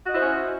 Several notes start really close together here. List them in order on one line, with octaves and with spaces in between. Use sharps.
F#4 D#5 E4 C5 C#4